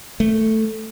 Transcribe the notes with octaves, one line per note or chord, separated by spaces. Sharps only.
A3